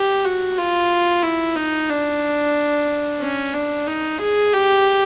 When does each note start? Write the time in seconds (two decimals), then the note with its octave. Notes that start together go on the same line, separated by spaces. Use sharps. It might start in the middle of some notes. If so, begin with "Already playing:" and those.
Already playing: G4
0.25 F#4
0.58 F4
1.23 E4
1.56 D#4
1.89 D4
3.21 C#4
3.54 D4
3.88 D#4
4.20 G#4
4.53 G4